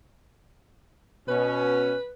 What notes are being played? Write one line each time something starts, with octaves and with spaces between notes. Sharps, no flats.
B2 C#4 B4